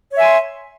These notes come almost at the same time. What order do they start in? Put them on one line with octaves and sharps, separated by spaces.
C#5 E5 G#5 C6